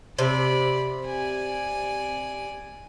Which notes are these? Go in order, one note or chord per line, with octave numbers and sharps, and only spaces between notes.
C3 D5 B5
D5 G#5